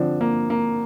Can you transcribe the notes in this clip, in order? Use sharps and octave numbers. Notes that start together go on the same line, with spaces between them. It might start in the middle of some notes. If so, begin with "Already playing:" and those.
Already playing: D3 F3 C4 D4
A#3
A#3